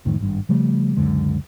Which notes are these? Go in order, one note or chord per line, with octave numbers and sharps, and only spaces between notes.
C2 F2 A2 D#3
G#1 G2
C#3 F3 G3 A3
C#2 F#2 D3 G#3